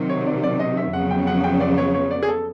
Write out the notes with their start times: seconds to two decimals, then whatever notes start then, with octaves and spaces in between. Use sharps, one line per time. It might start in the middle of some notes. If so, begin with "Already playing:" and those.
Already playing: C3 D#3 F#3
0.09 C#5
0.26 D5
0.43 D5
0.60 D#5
0.77 E5
0.93 F2 C#3 F#3 B3 F#5
1.11 G5
1.27 F#5
1.44 G5
1.60 D5
1.78 C#5
1.94 C#5
2.11 D5
2.23 G#4
2.28 A4